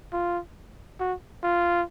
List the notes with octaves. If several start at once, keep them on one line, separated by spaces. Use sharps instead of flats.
F4
F#4
F4